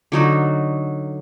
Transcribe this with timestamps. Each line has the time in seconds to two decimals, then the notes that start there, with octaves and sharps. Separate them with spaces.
0.12 D3 F#3 D#4 F#4